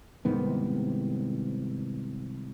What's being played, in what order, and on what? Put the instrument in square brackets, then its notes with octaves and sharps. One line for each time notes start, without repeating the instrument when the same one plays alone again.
[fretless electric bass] C2 G#2 D#3 B3